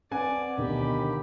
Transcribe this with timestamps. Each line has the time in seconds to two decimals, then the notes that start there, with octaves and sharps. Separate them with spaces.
0.11 C4 B4 D5 F#5 G#5
0.58 D2 B2 D#3 G4 B5